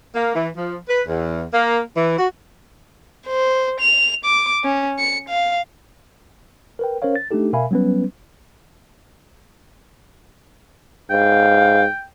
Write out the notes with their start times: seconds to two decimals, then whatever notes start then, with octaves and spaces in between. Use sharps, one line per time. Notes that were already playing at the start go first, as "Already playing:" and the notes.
0.15 A#3
0.34 E3
0.55 F3
0.88 B4
1.07 E2
1.52 A#3
1.96 E3
2.17 F#4
3.27 C5
3.81 F7
4.25 D6
4.64 C#4
4.99 C#7
5.29 F5
6.79 A#4 B4 G5
7.02 C#4 A#4 C5 C#5 F5
7.16 A6
7.31 A3 D4 D#4 G4 A4
7.53 B2 A#4 E5 F5 G#5 B5
7.71 F#3 G3 B3 C#4 B4
11.11 G#2 F5 G5